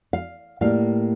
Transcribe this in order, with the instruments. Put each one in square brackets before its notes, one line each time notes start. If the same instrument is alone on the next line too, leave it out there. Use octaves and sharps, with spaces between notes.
[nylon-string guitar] F5
A2 G3 A#3 F5